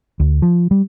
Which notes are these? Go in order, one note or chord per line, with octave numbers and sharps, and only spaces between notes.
D2
F3
G3